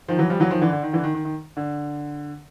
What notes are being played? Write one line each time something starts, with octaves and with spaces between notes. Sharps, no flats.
D#3 F3
E3 F#3
F3 G3
E3 F#3
D#3 F3
D3 E3
D3
D#3
D3 E3
D#3
D#3
D#3
D3